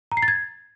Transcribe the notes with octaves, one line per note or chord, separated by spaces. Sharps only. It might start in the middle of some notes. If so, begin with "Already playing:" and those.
A#5
C7
A6
G#6